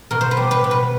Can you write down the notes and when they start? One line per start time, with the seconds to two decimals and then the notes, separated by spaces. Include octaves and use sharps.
0.11 B2 A#4
0.21 C5
0.31 B4
0.37 G3
0.51 B4
0.64 B2
0.71 B4